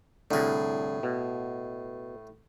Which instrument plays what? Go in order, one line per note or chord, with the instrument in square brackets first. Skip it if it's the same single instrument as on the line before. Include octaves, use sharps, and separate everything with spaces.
[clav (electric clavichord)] C2 D3 [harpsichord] A2 G#4
[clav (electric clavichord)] B2